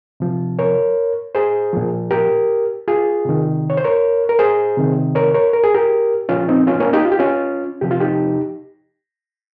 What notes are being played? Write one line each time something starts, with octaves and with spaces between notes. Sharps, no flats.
C3 F3
A#4 C#5
G#4 C5
A#2 F3
G4 A#4
F4 G#4
C3 D#3
C#5
C5
A#4 C#5
A#4
G#4 C5
C3 D#3
A#4 C#5
A#4 C#5
A#4
G#4
G4 A#4
A#2 F3 C#4 F4
C4 D#4
C#4 F4
A#3 C#4
D#4 G4
F4
G4
C#4 F4
C3 F3 G4
F4
D#4 G4